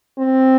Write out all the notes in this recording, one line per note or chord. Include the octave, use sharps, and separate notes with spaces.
C4